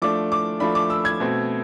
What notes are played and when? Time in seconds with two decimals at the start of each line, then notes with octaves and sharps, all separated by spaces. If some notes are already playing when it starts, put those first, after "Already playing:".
0.02 F3 A3 D4 D6
0.32 D6
0.60 F3 A3 D4 B5
0.75 D6
0.90 E6
1.05 G#6
1.20 B2 A3 C4